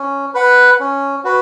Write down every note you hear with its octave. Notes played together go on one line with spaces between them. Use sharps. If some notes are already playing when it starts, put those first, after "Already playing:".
Already playing: C#4
B4 F#5
C#4
F#4 B4